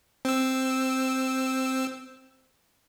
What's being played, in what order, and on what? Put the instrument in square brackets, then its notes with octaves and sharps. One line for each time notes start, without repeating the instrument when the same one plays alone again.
[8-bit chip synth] C4 E6